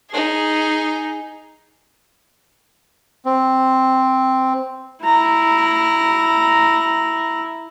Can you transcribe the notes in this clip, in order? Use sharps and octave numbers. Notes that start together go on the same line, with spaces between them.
D#4 G#4
C4
E4 A#5